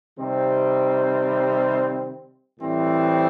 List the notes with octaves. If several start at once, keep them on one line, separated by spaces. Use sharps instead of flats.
C3 D#3 G3 C4
A2 E3 G3 C4